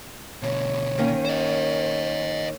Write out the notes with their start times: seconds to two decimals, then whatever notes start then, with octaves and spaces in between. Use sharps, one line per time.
0.42 B2 D3 C#5
0.98 D#3 A#3 C#4
1.25 C5 D#5